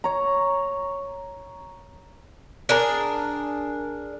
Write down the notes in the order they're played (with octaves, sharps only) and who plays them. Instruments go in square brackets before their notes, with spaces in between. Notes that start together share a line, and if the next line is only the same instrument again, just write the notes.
[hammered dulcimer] C#5 A#5
[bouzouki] D4 G#4 A#4